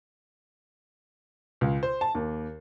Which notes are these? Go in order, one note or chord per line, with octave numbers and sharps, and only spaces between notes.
C#2
C5
A5
D#2